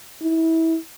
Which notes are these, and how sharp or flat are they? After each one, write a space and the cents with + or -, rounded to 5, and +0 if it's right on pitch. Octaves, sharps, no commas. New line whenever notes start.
E4 -25